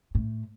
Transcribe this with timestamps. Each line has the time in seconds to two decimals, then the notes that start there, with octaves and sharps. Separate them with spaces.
0.15 A2